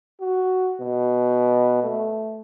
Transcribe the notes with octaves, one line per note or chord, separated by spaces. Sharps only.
F#4
B2
A3